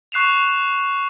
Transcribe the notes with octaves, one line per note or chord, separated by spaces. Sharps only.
C#6 F#6 C7 E7 F7